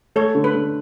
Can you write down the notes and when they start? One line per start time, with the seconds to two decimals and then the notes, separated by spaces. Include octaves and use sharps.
0.16 A3 A4 C#5
0.35 D3
0.44 B4
0.54 D3